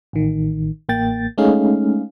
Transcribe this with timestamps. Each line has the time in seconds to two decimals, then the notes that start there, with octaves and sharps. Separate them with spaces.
0.13 A1 D#3
0.89 A1 A#3 G5 A6
1.38 G#3 A3 C#4 D#4 G#4 F5